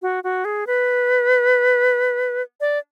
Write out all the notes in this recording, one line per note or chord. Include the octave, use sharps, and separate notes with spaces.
F#4
F#4
G#4
B4
D5